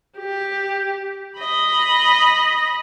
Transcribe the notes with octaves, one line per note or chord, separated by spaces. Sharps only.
G4
D#5 B5